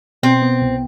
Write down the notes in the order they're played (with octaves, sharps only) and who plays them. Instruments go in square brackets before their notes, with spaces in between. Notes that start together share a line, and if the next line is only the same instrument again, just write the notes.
[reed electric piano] B2 [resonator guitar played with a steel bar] C4
[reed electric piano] B3
C2